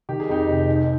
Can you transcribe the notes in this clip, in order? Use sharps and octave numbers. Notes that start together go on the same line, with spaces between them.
D#3 G4
G#4
F2 D#4 G4
F1
G#2